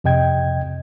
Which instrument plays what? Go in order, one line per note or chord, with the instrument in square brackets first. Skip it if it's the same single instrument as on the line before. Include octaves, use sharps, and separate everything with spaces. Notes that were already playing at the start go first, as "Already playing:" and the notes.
[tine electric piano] F2 C3 D#5 G5 G#6